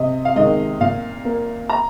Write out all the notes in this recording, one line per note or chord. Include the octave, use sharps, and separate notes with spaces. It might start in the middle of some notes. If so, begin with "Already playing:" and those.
Already playing: C3 D#5
F5
D#3 G#3 D#5
A#2 F5
A#3
A#5